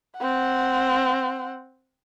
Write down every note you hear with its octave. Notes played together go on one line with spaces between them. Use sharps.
C4 F#5